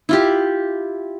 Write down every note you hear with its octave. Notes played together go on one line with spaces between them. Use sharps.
E4 F4 G4